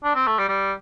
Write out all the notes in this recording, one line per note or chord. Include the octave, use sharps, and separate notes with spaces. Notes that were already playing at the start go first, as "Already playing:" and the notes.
D4
C4
A3
G3
G3